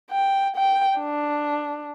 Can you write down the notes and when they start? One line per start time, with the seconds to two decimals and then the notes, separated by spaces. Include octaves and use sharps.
0.11 G5
0.56 G5
0.99 D4